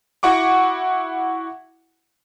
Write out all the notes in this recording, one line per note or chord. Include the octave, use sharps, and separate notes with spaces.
E4 F#4 F#5 C#6 D6